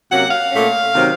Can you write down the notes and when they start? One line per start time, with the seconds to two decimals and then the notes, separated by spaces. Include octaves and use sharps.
0.10 C3 F#3 A#3 C#4 F#5
0.31 F5
0.52 A#2 A3 C#4
0.93 C3 D#3 F#3 C4